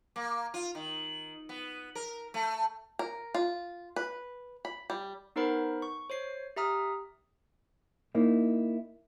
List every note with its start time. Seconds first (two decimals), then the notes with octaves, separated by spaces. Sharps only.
0.16 A#3
0.54 F4
0.75 D#3
1.49 B3
1.95 A#4
2.34 A3
2.99 A#4
3.35 F4
3.96 B4
4.65 B5
4.90 G3
5.36 B3 D#4 A#4 C5 F#5 B5
5.82 C#6
6.10 C5 C#5 C7
6.56 G4 E5 A#5 D#6 F6
8.15 A#3 D#4 E4